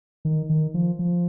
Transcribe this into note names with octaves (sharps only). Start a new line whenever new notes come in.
D#3
D#3
F3
F3